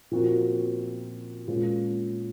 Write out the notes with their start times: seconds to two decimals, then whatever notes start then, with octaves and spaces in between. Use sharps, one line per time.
0.11 A#2 F3 C4 F#4 A#4
1.48 A#2 G#3 C#4 F4